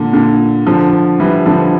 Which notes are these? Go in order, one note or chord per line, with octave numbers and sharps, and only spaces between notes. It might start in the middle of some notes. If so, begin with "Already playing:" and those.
Already playing: A#2 D3
A#2 D3
D3 F3
E3 G3
D3 F3